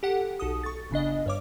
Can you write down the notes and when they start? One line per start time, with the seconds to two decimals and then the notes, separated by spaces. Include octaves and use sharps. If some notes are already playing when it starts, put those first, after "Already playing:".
0.03 G4 A4 F#5
0.40 B1 A4 D#6
0.63 C#6 A6
0.91 G1 C#3 D4 D#5
1.26 G2 C#5 D6